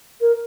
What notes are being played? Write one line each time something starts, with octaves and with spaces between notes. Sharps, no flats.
A#4